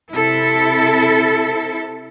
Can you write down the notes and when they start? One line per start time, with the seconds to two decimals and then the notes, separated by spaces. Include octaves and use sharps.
0.12 C3 E4 A4